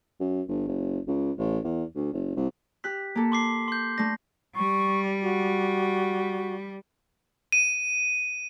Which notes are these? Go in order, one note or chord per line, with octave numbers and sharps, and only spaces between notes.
F#2
G1
F#1
C#2
A1
E2
D2
F#1
C2
G4 F#6 B6
A#3 A4
C6 D6 C7
C6 G6
A3 D4 A#6
G3 C#6
F#4
D#7